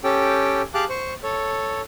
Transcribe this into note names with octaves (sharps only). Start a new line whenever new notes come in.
C#4 G4 A4 G5
G4 G#4 F5 A5 D6 F#6
C5 C#6
A4 C#5